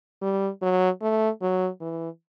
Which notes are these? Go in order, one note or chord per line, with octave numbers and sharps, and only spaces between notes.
G3
F#3
A3
F#3
E3